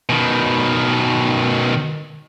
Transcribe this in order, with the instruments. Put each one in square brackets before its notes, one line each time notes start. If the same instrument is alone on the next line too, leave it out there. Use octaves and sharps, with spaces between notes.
[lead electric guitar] B2 D#3